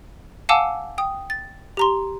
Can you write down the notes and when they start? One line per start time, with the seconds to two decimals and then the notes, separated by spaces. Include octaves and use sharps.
0.49 F5 F#5 G#5 A5 D6 E6
0.98 G5 D#6
1.30 A6
1.77 G4 A#5 C6